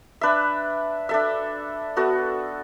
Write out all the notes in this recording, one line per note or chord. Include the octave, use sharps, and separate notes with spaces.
D4 B4 E5
D4 A4 E5
B3 F#4 A4